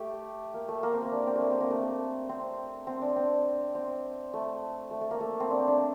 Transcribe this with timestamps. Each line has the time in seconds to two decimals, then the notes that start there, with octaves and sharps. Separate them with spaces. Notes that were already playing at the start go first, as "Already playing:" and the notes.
Already playing: A3 G4
0.54 A#3
0.69 A3
0.83 A#3
0.93 C4
1.02 A#3
1.12 D4
1.27 C4
1.36 A3
1.42 A#3
1.51 C4
1.61 A#3
1.70 A3
2.29 C4
2.87 C4
3.02 D4
3.16 C4
3.75 C4
4.34 A3
4.91 A3
5.01 A3
5.11 A#3
5.21 A3
5.40 C4
5.50 D4
5.59 C4
5.68 D4